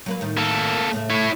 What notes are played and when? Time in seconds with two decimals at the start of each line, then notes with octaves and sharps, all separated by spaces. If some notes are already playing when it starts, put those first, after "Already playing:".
0.06 F#3 A#3 B4
0.21 A2 D#3
0.37 A#3 A4
0.93 A2 C#3 A3
1.10 E4 C#5